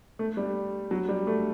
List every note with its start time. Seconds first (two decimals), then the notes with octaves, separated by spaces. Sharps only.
0.19 A3
0.37 G3
0.91 F#3
1.09 G3
1.27 A3